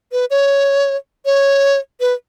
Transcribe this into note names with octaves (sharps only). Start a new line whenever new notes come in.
B4
C#5
C#5
B4